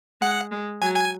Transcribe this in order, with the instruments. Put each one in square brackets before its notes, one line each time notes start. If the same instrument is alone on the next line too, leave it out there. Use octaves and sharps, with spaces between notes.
[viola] G#3 [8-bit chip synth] F#5
[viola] G#3
[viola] F#3 [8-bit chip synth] G#5
[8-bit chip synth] G#5